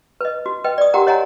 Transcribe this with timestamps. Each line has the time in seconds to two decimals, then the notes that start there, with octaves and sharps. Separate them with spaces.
0.21 B4 D#5
0.46 F#4
0.64 B4 D#5 G5
0.78 D5 D#6
0.94 F#4 G4 A#4 F#5 G5 A#5
1.07 C#5 D#5 F#5 G#5 A#5